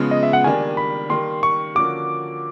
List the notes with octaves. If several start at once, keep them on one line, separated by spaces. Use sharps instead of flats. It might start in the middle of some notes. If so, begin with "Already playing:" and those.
Already playing: C#3 F3 G#3 B3
D#5
E5
F#5
D#3 G3 A#3 D4 G#5
B5
D#3 G3 A#3 C6
C#6
D3 F3 A#3 C#4 F#4 D6